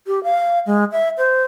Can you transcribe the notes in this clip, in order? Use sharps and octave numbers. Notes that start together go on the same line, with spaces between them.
G4
F5
G#3
E5
C5